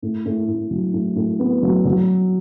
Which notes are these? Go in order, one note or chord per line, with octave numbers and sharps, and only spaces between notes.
A2
A2
A2
F#3
A2
A2
B3
F#3
F#3